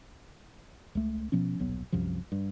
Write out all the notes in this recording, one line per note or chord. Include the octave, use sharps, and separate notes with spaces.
C#2 A3
B2 F3 B3 C#4
D#1 B1 F#3 B3
C2 F#2 C3 F3
G2